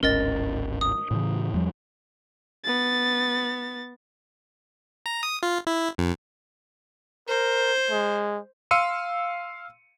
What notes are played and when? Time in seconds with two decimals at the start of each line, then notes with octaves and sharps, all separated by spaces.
0.03 D1 G#1 C#4 A#4 D#5 A6
0.81 D#6
1.11 A2 C#3 E3
1.54 E2 F3 G3
2.64 B3 A6
5.06 A#5
5.23 D#6
5.43 F4
5.67 E4
5.98 F2
7.28 A#4 C5
7.91 G#3
8.71 F5 C6 E6 C#7 D#7